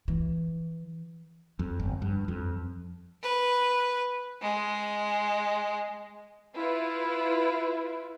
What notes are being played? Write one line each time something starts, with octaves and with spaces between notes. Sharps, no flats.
E3
F2
G1
G2
F2
B4
G#3
E4 F4 B4